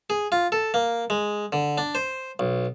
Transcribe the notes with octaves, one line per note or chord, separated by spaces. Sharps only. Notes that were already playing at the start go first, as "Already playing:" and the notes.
G#4
F4
A4
A#3
G#3
D3
D4
C5
B1